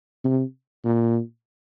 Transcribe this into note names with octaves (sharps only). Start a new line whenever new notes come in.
C3
A#2